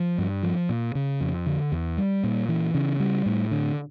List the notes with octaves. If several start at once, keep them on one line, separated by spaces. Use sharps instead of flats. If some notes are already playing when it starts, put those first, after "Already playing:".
Already playing: F3
G2
F3
A#2
C#3
F2
D3
E2
G3
A#2
E3
C#3
G3
A2
D3